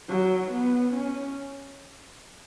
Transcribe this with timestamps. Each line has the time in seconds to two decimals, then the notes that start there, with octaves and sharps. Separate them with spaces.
0.09 F#3
0.52 B3
0.94 C#4